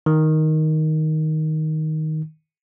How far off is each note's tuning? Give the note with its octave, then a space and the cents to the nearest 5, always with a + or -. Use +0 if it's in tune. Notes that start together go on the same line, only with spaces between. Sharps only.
D#3 +5